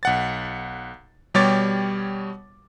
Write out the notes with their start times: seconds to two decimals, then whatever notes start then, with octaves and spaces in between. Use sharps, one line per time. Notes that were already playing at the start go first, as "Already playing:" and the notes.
0.03 B1 F#5 A6
1.34 B2 G3 G4 C#5 D6 A6